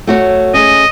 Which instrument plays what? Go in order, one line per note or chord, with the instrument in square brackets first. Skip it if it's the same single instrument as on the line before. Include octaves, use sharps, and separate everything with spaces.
[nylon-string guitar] A3 F#4 C#5
[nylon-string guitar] C#4 G#4 [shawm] D#5